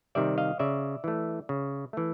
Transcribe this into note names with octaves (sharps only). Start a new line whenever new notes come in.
C3 D#3 G3 D5 E5
D#5 F5
C#3 D5 E5
E3 A3
C#3
E3 A3